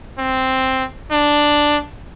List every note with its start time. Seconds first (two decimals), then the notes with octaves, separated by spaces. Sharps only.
0.19 C4
1.12 D4